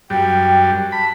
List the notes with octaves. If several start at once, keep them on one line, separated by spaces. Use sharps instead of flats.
F#2 G3 G5
A5 B5